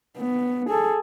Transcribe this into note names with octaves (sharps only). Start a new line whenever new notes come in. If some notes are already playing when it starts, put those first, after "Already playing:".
B3
G#4 A4